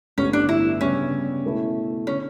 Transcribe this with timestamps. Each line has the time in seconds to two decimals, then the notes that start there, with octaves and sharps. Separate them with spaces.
0.17 A1 G2 D3 G3 B3 C#4
0.33 D4
0.49 E4
0.81 C#3 G3 B3 C#4 D4 G4
1.44 B2 A3 E4
2.07 D3 C#4